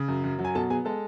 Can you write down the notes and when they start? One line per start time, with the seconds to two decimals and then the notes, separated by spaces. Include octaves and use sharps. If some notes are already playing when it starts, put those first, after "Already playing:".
Already playing: C#3
0.08 F#2
0.24 F#2
0.39 F#3
0.45 G#5
0.55 B2 A4 A5
0.70 B3 G#4 G#5
0.85 G#3 A4 A5